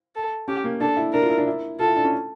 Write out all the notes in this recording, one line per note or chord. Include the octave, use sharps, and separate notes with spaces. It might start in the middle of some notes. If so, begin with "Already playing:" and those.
A4
C#4 G4
A#3
D4 A4
E4
D4 A#4
F4
E4
D4
E4
F4 A4
E4
D4
C#4